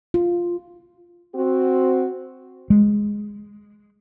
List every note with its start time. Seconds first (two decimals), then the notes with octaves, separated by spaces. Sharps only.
0.14 F4
1.35 C4 F#4
2.70 G#3